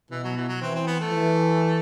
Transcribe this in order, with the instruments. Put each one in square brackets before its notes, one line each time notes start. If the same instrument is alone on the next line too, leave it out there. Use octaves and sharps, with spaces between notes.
[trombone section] B2 [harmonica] E3
[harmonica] F#3
E3
F#3
[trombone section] E3 [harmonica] C4
[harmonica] C4
B3
A3
[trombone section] E3